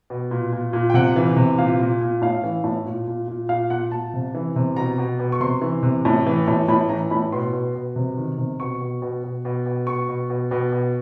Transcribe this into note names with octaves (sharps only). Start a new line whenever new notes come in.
B2
A#2
A#2
A#2
G5
C3 F#5
E3
C3
A#2 F5
A#2
A#2
A2 F5
E3
A2
A#2
A#2
A#2
A#2 F5
A#2 F#5
A#2 A5
C3
E3
C3
B2 A#5
B2
B2
C#6
C3 C6
E3
C3
A2
E3
A2
A2 B5
E3 A#5
A2 B5
B2 C6
B2
B2
C3
D#3
C3
B2 C#6
B2
B2
B2
B2
B2
B2 C#6
B2
B2
B2
B2